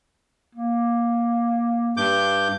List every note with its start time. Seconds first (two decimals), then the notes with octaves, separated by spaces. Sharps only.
0.55 A#3
1.97 G2 D6 G6